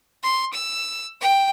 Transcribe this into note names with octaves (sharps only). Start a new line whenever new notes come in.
C6
E6
G5